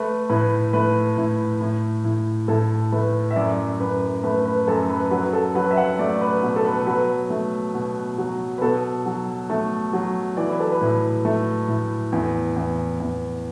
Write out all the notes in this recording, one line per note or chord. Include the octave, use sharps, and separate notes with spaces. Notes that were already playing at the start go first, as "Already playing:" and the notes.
Already playing: A3 B4
A2 B4
A3 B4
A2
A2
A2
A2 A4
A3 B4
E5
F#2 D5
F#2 B4
A3 B4
B4
F#2 A4
B4
F#3 B4
A4
F#3 B4
E5
F#5
A3 D5
B4
B2
A4
B4
F#3 B4
A3
B2
F#3
B4
B2 A4
F#3
A3
F#3
E3 D5
B4
A4
B4
A2
A3
A2
E2
E2
E2